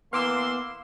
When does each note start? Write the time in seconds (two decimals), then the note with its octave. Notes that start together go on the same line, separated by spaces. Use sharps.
0.13 E3 A#3 B3 F5 C6 D6 E6